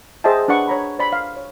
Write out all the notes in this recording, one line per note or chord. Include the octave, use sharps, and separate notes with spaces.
G#4 C5 D#5 E5 G5 A5
D4 B4 D5 F#5 C#6
C#5 A#5 B5
C5 D5 B5
F5
C#5